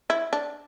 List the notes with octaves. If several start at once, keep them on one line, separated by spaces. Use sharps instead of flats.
E4
D4